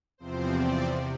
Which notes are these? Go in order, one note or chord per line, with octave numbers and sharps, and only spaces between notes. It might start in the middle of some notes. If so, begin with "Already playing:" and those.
E2 C3 F3 C4 C5
D5
C3